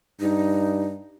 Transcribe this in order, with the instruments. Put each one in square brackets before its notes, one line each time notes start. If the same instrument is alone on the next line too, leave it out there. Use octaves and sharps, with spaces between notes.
[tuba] G2 [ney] D#4